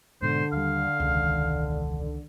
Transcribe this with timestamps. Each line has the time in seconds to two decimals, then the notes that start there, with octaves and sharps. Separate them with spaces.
0.22 G#2 B2 D3 C5
0.52 D#2 G3 F5
1.00 E1 C#2 D#3